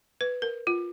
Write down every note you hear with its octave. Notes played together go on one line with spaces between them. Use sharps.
B4
A#4
F4